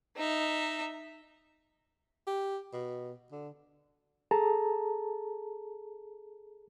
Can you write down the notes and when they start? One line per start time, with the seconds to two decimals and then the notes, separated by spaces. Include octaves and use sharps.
0.17 D#4 E5
2.27 G4
2.73 B2
3.32 D3
4.31 G#4 A4 A5 A#5